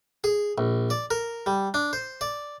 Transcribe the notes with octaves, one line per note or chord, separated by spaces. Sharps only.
G#4
A#1
D5
A#4
G3
D4
C5
D5